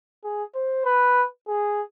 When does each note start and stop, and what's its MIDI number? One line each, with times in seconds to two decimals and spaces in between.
0.24 0.44 68
0.55 0.80 72
0.85 1.25 71
1.48 1.82 68